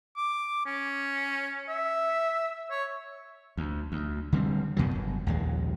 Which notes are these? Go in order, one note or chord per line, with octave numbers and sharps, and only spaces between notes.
D6
C#4
E5
C#5
D2
D2
D3 G3 C4
F#2 B2 D#3 F#3
G1
A#1 D#2 G#3